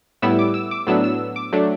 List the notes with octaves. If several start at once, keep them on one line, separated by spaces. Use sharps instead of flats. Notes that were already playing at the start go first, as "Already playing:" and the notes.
A2 G3 B3 E4 E6
D6
E6
D6
A2 F#3 B3 D4 E6
E6
D6
F#3 A3 D4